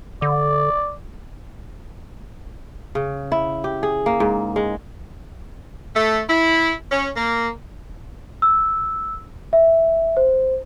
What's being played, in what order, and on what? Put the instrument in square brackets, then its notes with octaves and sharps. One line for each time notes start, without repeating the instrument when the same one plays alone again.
[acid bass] D3 [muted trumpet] D5
[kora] C#3
E4
G4
G#4
A#3
G#2
G#3
[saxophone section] A3
E4
C#4
A#3
[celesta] E6
E5
C5